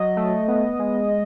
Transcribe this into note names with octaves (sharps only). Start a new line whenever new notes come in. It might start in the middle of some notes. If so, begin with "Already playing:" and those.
Already playing: F#3 D#5
A3
B3
G#3